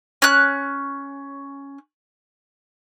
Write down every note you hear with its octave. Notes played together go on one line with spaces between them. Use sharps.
C#4 F#6